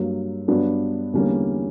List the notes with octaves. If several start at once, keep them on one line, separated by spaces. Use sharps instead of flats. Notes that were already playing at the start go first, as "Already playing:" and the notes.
Already playing: G2 F#3 A#3
G2 F#3 B3 D4
E2 D3 G3 A#3 C#4